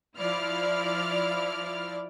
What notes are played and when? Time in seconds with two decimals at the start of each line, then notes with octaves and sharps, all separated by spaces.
0.18 F3 E4 D5 F6